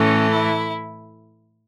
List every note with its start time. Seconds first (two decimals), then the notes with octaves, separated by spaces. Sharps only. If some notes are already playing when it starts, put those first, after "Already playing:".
Already playing: A2 E3 A3 C#4
0.30 E4